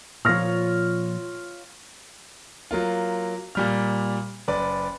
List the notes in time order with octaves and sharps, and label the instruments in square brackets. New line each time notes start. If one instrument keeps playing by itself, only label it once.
[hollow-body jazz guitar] A#2 F3 [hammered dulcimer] F4 C#5 [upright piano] F6 A#6
[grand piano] F#3 A#3 F4
A#2 G3 F6
F#1 B4 D5